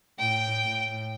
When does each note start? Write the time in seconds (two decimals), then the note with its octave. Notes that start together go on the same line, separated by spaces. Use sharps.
0.18 A2 G5
0.65 A2